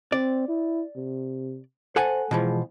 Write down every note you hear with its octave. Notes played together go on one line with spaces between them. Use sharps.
C4 D5
E4
C3
A4 C5 F#5 G#5
B2 E3 F3 G#3